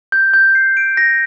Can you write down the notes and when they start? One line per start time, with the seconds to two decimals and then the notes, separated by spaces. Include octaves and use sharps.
0.12 G6
0.34 G6
0.55 C7
0.77 D7
0.97 A#6